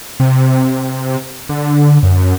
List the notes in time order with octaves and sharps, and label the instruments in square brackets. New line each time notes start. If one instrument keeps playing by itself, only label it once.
[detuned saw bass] C3
D3
F#2